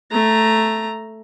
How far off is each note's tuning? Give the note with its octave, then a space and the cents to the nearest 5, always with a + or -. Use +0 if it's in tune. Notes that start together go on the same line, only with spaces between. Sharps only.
A3 +0 A#5 +0